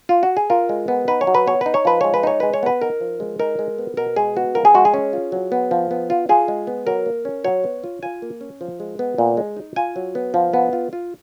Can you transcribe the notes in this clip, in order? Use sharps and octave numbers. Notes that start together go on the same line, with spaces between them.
F4
F#4
G#4
F4 A#4
G#3
B3
D#4 B4
C#5
F#3
B4
B3 C#5
D#4 B4
C#5
F3 B4
G#3 C#5
B4
D#4 C#5
G#3 B4
C#5
B3 B4
D#4 A#4
F3
G#3
D#4 A#4
G#3
B3
B2 A#4
G#3 G#4
B3 F#4
F3 A#4
G#4
G#3 F#4
G#4
C#4
F4
F#3
B3
F3
B3
F4
F4 G#4
G#3
B3
F#3 A#4
A#3
C#4
F#3 C#5
B3
F4
F4 G#5
A#3
C#4
F3
G#3
B3
A#2
G#3
D#4
F4 G#5
F#3
B3
F3
B3
F4
F4